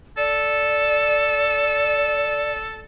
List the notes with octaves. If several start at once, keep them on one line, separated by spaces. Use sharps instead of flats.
A4 D5